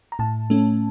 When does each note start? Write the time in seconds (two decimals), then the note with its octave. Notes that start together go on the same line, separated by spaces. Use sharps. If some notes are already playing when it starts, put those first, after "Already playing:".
0.12 A#5
0.19 A2 A5
0.50 A3 C#4